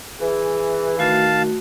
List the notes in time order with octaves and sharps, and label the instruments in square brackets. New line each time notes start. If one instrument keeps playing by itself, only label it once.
[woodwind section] E3 [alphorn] G#4
[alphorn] D#3 [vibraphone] A3 F#4 [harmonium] F5 A5